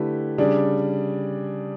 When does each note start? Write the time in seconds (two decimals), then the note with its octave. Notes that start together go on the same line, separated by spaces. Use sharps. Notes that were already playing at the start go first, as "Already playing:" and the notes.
Already playing: D3 A3 E4 G4 B4
0.38 C#3 G3 D4